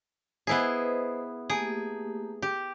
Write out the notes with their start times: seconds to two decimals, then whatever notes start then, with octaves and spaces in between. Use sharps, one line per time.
0.47 B3 E4 G#4 B4 C5 D#5
1.50 A3 A#3 G4 G#4
2.42 G4